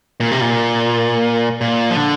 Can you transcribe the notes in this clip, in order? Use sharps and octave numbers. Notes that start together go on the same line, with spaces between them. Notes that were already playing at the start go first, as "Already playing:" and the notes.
A#2
C3
A#2
A#2
F3
D3